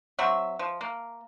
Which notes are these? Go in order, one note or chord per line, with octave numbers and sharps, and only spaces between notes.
F#3 C4 E5
F3
A#3